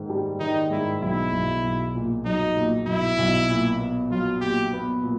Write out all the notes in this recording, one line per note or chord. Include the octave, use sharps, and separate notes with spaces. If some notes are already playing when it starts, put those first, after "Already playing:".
Already playing: G#2 D#3
G3
D#3 D#4
G#2 E4
B1 E4
B1
B1
A#2
F#3 D#4
A#2
B1 E4
B1
A#2
B3
F#3 F4
A#2 G4
B3
A#2